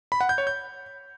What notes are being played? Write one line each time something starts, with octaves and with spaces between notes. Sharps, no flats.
B5
F#5
G6
C#5
G6